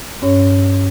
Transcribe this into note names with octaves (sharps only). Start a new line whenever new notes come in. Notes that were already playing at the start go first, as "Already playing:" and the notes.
G2 C#4 C#5